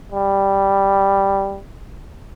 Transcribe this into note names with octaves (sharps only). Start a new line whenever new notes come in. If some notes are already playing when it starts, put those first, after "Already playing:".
G3